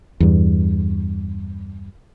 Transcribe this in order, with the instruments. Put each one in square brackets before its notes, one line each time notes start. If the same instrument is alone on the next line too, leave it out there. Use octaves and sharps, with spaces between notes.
[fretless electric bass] E2 G2